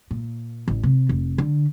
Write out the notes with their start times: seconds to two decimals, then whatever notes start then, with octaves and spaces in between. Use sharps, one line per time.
0.11 A#2
0.68 A1
0.83 C3
1.09 F1
1.38 D3